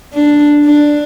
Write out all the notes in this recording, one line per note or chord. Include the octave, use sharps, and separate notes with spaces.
D4
D4